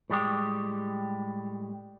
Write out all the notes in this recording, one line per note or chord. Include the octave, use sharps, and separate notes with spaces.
A2 G3 G#3 G4